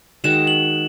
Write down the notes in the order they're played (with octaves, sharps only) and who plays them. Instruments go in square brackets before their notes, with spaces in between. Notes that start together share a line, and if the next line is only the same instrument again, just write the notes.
[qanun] D#3 G#3 D#4 F#4 [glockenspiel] E7
[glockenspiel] F#7